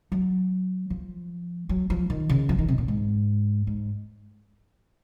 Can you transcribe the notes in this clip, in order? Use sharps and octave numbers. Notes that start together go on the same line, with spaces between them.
F#3
F3
F#3
F3
D#3
C#3
F3
D#3
C3
A#2
G#2
G#2